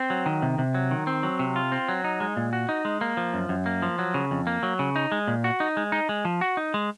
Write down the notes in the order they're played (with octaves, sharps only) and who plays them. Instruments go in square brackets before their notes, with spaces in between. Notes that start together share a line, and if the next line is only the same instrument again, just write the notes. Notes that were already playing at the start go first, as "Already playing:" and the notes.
Already playing: [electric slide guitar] C4
F#3
D#3
C3
C3
F#3
D#3
C4
F#3
C3
F4
C4
F#3
D#4
G#3
A#2
F#4
D#4
G#3
A#3
F3
F#2
F#2
A#3
F3
F#3
C#3
F2
A#3
F#3
C#3
D#4
G#3
A#2
F#4
D#4
G#3
D#4
G#3
F3
F#4
D#4
G#3